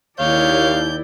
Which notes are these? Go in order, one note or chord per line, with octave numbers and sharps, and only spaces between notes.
D#2 E4 C#5 D5 F5 G6